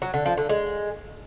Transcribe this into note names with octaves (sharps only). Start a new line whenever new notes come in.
F#3
D3
F3
D3
G#3